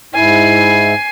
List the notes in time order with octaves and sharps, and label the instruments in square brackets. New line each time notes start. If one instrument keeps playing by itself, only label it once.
[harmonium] G#2 E4 [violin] G#5 C7